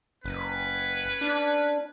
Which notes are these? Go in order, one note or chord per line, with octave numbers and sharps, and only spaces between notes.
F#1 C#4 B4
D4